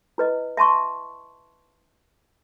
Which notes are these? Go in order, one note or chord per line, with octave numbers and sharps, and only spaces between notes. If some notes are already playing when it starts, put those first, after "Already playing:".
E4 B4 D#5
E5 A5 C6 C#6